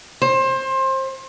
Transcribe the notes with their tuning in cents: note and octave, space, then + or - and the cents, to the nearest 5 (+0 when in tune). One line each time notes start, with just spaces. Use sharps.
C5 +25